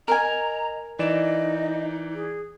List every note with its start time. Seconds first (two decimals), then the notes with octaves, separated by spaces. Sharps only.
0.08 A#4 D#5 G#5 A#5
0.99 E3 D#4 D5 D#5 E7
2.14 G#4